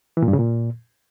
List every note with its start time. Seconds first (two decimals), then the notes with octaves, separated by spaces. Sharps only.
0.17 E3
0.22 A#2
0.28 G2
0.33 C#3
0.39 A#2